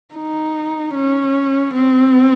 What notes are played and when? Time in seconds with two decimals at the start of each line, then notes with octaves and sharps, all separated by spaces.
0.14 D#4
0.95 C#4
1.74 C4